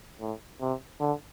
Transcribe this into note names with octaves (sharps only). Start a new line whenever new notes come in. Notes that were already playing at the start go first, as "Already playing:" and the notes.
A2
C3
D3